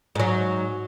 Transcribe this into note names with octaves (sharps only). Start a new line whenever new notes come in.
G#2 F#3